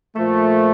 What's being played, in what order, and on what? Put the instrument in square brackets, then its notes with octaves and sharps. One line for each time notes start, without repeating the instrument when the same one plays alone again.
[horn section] A#2 F3 A3